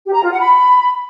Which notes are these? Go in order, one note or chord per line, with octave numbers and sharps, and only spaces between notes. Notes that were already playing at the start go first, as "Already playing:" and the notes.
G4
A#5
F4
F#5
B5